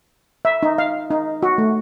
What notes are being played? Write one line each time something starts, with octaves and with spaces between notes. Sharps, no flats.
E5
D#4
F5
D#4
F#4
A3